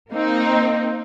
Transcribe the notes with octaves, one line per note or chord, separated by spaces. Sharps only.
A#3 C4 D#4